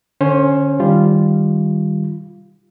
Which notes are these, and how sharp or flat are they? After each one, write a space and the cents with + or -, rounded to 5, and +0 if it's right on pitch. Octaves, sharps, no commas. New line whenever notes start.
D3 +10 C#4 +0 C5 +25
D#3 +0 G3 +0 F4 -10